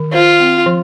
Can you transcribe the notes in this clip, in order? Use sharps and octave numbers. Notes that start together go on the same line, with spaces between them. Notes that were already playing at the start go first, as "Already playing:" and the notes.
Already playing: D#3
F4 C5
C4
F3